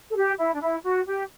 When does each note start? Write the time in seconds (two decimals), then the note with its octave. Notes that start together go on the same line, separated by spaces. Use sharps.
0.12 A4
0.16 G4
0.38 E4
0.54 D4
0.61 E4
0.84 F#4
1.06 G4